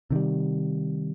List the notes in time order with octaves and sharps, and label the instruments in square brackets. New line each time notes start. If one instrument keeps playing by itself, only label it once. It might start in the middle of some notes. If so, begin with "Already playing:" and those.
[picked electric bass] C3 D#3 G3